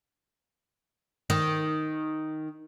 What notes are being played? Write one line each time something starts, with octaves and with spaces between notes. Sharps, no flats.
D#3